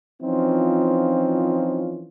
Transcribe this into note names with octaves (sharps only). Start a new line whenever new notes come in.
E3 F3 C4 C#4 D#4 F4